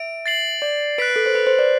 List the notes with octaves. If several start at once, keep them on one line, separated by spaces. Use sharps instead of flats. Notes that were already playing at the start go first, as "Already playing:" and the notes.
Already playing: E5 D7
A6 C7 F#7
D5
B4 F#6 B6 D7
B4
A4
C5
B4
C5
D5